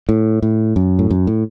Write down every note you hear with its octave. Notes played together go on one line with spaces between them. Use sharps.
A2
A2
F#2
A2
F#2
A2